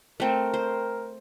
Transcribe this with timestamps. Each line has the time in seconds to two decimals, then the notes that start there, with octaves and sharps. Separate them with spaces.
0.20 A3 C4 A#4
0.54 C5